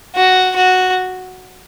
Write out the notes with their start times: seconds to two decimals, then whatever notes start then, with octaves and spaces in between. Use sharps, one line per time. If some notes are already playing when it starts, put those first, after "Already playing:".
0.15 F#4
0.56 F#4